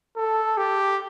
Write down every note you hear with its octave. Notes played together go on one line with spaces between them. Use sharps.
A4
G4